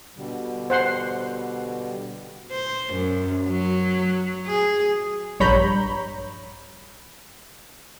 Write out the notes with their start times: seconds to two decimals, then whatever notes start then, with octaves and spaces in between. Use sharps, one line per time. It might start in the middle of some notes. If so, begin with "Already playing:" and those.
0.17 B2 D3 G3
0.70 C5 F#5 C6
2.51 C5
2.93 F#2
3.47 F#3
4.47 G#4
5.40 A#1 G2 C#5 A#5 B5 G6